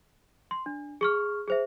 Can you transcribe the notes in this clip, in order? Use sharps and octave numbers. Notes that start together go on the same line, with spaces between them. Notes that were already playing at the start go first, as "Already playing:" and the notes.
C6
D4
G#4 C#6 F6
G#4 C5 E5